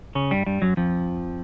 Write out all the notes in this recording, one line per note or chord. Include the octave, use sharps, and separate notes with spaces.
C#3 C#4
G2 G3
G2 G3
F#2 F#3
F2 F3